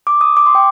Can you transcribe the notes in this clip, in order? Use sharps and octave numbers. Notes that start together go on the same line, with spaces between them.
D6
D#6
D6
C6
G5